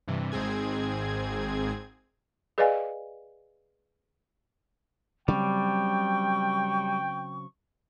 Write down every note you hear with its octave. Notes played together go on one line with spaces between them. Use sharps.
G2 C3 E3
G#1 G#2 C4 G#4 G#6
G#4 B4 D5 D#5 F5 G#5
C#3 F#3 G3 C4 G5 C#6